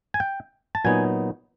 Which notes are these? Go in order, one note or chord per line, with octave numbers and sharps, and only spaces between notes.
G#5
G5
A5
A#2 F#3 B3 D#4 G#5